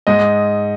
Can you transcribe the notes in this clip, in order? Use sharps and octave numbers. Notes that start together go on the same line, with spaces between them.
G#2 D#5